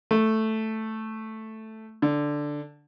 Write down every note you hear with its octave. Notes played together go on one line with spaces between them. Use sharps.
A3
D3